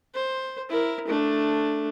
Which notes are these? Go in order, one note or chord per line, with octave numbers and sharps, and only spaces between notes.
C5
E4 A#4
A3 D4